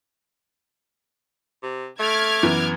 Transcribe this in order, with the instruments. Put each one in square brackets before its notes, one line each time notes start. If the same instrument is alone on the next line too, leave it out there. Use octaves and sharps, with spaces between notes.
[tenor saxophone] C3
[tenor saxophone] A3 [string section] D6 F6 G#6
[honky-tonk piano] F#2 E3 B3